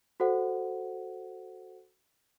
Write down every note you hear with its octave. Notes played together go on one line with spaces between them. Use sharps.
F#4 A4 C5 F#5